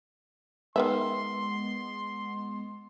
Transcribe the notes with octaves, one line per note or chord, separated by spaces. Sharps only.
D#3 G#3 B3 B4 E5 C6